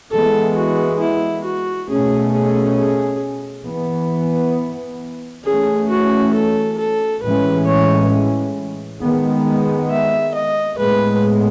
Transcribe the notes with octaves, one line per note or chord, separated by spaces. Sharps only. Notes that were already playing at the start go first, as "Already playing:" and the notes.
E3 G#3 B3 A4
F#4
E4
F#4
B2 A3 C#4 G#4
G#4
G#4
E3 B3
E3 A3 C#4 G#4
F#4
A4
A4
A2 E3 G#3 C#4 B4
C#5
D#3 G#3 B3
E5
D#5
A2 G#3 B3 B4